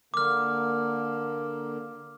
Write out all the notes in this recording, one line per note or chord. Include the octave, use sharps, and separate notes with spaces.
D3 A#3 D6 F6